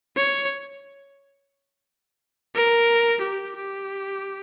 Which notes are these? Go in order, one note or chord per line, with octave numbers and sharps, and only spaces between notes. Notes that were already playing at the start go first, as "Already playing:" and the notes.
C#5
A#4
G4
G4